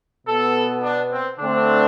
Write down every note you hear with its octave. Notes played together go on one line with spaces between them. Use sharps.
B2 B3 A4
D4
C4
D3 A3 C4 D4